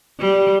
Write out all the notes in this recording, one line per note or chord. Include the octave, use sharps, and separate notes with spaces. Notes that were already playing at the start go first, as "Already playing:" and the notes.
G3